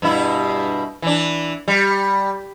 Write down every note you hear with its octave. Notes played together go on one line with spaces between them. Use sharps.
G2 B2 E4
E3 D4
G3